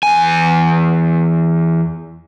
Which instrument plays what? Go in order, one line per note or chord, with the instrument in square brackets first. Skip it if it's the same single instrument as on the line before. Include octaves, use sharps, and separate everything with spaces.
[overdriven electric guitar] E2 G#5